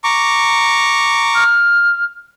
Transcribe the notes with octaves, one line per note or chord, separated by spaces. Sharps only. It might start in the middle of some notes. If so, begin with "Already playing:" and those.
A#5 C#6 D6
F6